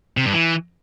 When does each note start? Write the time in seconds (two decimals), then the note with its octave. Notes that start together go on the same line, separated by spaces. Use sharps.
0.17 C3
0.25 G2
0.33 E3